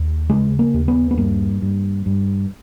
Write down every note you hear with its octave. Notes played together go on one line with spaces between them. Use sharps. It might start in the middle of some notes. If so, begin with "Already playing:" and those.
Already playing: D#2
C#3 G#3
A#3
D#2
B3
B3
G2 A#3
G2
G2